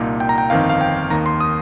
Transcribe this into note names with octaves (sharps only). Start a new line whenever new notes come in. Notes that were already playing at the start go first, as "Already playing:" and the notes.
Already playing: C2 A#2 A#3 D#4
G5
A#5
G5
G1 F2 D#3 C4 D#4 F5
F5
G5
D#2 D#3 A#3 D#4 A#5
C6
D#6